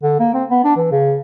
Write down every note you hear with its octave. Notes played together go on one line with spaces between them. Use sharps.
D3
A#3
C4
B3
D4
E3
C#3